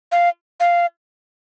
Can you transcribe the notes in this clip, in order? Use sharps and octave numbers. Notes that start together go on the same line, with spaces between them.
F5
F5